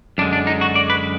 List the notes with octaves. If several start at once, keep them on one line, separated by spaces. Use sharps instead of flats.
F#2 D3 G#3 D4
D4
D#4
F#4
D5
B4